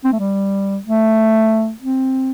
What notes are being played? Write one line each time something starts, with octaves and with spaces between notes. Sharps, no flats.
C4
A3
G3
A3
C4